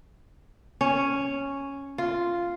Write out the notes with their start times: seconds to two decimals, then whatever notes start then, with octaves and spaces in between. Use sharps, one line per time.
0.81 C#4
1.98 F4